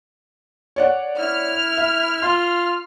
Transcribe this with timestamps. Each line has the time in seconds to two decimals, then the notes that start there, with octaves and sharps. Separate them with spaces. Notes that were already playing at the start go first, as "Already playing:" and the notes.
0.76 C#5 D5 F#5
1.18 E4 F6
1.77 E5
2.22 F4 C6